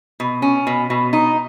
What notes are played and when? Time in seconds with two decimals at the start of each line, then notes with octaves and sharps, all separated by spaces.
0.20 B2
0.42 C#4
0.67 B2
0.90 B2
1.13 D#4